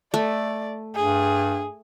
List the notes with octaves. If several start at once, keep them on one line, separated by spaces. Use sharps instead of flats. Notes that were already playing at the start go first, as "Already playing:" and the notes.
A3 D5
G2 G#4